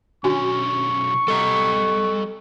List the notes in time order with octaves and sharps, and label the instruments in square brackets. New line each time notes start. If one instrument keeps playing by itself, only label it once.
[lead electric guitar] B1 C#4 [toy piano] D4 F#4 G#5 [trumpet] C#6
[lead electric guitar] G3 [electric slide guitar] A4 D#5 A#5